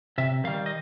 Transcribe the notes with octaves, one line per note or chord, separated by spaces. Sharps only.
C3 E5
D#3 G3 F5
D#5